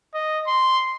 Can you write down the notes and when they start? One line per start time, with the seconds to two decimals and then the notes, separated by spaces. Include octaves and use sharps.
0.14 D#5
0.47 C6